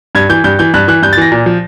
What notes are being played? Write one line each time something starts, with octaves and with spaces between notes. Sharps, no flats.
G2 G#6
E3 G6
G2 G6
E3 G6
G2 F#6
E3 F#6
G2 G6
A6
E3 A#6
A#2
F3